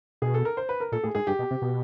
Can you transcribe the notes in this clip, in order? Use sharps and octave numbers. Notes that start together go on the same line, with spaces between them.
B2 G#4
A4
A#4
C5
B4
A#4
A#2 A4
A2 G#4
G#2 G#4
G2 G4
B2
C3
B2